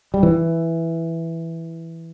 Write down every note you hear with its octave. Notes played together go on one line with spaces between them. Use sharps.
G3
E3